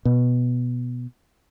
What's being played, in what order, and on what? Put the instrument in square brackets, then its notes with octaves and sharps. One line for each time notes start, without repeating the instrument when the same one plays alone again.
[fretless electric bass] B2